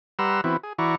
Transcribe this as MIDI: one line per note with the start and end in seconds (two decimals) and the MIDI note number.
0.19 0.41 55
0.19 0.41 71
0.19 0.41 78
0.19 0.41 82
0.19 0.41 84
0.19 0.41 88
0.44 0.57 52
0.44 0.57 59
0.44 0.57 60
0.44 0.57 64
0.44 0.57 66
0.63 0.73 68
0.79 0.95 52
0.79 0.95 64
0.79 0.95 66
0.79 0.95 74
0.79 0.95 82
0.79 0.95 85